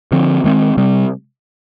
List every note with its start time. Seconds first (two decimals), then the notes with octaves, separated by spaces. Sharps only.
0.12 D3 F3 C4
0.44 D#3 G#3 C4
0.77 C3 G3 C4